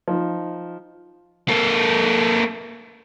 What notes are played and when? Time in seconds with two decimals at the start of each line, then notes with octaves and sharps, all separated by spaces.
0.08 F3 D#4
1.48 A#3 A4